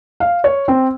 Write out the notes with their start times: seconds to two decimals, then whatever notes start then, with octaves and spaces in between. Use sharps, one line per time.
0.20 F5
0.44 C#5
0.68 C4